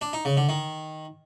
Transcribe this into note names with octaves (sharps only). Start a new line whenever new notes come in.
D4
D#4
C#3
D3
D#3